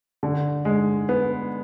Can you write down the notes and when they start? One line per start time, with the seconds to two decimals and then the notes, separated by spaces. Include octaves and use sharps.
0.23 D3
0.65 G#3
1.09 B3